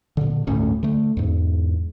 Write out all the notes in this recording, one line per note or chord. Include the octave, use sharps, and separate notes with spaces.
A#2 D3
G1 D2 A2 C#4
D3 A3
E2 G#2